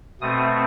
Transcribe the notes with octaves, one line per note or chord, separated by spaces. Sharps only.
B2 A3 C4 D#6